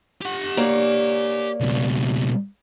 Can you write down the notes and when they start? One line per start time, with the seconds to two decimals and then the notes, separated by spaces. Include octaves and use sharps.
0.21 G4 F#5
0.57 A#3 C#5 D5
1.60 C#2 B2